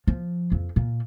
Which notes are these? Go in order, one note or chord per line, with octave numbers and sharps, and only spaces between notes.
F3
F2
A#2